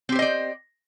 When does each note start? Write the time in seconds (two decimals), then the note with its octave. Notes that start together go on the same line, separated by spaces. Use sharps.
0.09 C4
0.12 G4
0.15 C5
0.19 D#5
0.22 D5